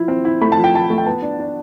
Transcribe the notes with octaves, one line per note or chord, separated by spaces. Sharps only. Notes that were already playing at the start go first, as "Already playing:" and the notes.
Already playing: F3 E4
C4
E4
A3 B5
F3 A5
G5
F3 A5
A3
G5
B3 A5
D4
D4